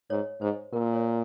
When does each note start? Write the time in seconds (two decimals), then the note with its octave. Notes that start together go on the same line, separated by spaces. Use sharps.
0.10 G#2 C#5
0.41 G#2 C5
0.73 A#2 A#4
0.94 C#5